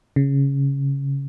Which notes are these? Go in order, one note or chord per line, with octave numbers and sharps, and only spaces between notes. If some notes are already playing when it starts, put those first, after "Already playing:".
C#3